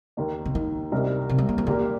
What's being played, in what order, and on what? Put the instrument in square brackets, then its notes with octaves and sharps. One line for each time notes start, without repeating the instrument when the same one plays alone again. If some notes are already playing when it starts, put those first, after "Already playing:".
[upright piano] D#2 D#3 A#3 D#4
[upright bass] C3
D#3
[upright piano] C2 C3 G3 D#4 A#4
[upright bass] C3
G3
A#3
F3
[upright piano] A#2 G3 A#3 G4 A#4 [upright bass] D#3